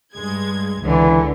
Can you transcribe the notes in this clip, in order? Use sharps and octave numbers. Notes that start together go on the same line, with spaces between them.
G2 G#3 G#6
C#2 D3 E3